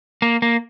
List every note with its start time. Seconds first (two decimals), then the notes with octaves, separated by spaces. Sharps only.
0.22 A#3
0.42 A#3